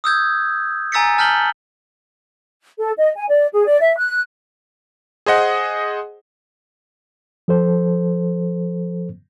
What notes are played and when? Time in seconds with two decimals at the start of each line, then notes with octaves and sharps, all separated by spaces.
0.04 D#6 E6 G6 G#6
0.92 G#5 A#5 E6 A6 B6 C#7
1.18 A5 F6 G6 B6 F#7 G7
2.78 A4
2.97 D#5
3.16 G#5
3.28 D5
3.53 G#4
3.66 D5
3.80 E5
3.96 F#6
5.26 G#4 C5 D#5 F#5
7.48 F3 A4 C5